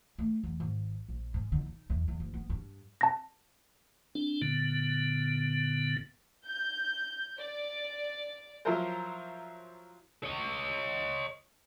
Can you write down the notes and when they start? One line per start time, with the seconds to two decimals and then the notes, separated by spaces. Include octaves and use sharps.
0.19 A3
0.44 E2
0.60 G#1
1.09 A#1
1.34 G#2
1.52 D3
1.66 D#4
1.90 E2
2.08 E2
2.20 F#1
2.34 B3
2.50 G2
3.01 A5 A#6
4.15 C4 D4
4.42 A#2 D3 B3
6.47 G6
7.37 D5
8.65 F3 F#3 E4 F4 A#4 C5
10.24 C#5 D#5